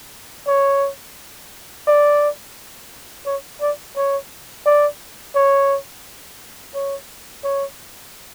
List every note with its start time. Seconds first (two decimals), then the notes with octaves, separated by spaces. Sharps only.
0.48 C#5
1.88 D5
3.26 C#5
3.61 D5
3.96 C#5
4.66 D5
5.36 C#5
6.75 C#5
7.44 C#5